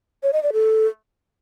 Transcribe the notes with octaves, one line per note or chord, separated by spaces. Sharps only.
C#5
D#5
D5
A4